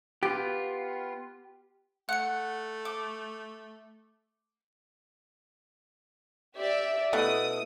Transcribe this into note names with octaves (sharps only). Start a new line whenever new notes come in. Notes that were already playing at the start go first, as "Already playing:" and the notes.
B3 F4 G4
A3 F#5 F#6 C#7
D6
G4 D5 E5
B2 A3 E4 D#6